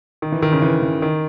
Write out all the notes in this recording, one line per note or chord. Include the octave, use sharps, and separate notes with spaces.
D#3
E3
D#3
C#3
E3
E3
D#3